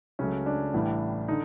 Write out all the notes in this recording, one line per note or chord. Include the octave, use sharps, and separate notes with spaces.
C#2 C#3 F#3 A3 C#4
D4
A1 A2 E3 G3
D3 D#4